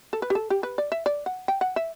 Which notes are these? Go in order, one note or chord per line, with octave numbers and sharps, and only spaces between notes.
A4
B4
G4
A4
G4
B4
D5
E5
D5
F#5
G5
F#5
E5